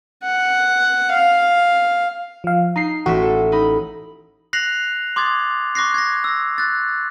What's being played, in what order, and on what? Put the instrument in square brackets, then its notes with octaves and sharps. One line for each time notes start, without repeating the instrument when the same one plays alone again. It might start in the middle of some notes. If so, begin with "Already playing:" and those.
[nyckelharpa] F#5
F5
[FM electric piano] F3 F5
[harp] D#4 [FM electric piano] A#5 C7
[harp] A1 E5 [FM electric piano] F#4
[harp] A4
D#4 B5
[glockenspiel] F#6 A#6 C7 F7 F#7
C6 D6 D#6 G#6 A6
C#6 D6 F#6 A#6 C7
G#6 A#6
E6 A#6
F#6 A6